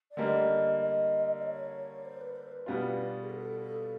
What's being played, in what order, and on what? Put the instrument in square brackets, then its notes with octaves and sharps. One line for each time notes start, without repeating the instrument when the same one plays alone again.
[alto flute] D5
[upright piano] D3 G3 A#3 [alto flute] D#5
[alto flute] D#5
C#5
C5
B4
C5
B4
[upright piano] B2 G3 B3 D4 F4
[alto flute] G#4
A4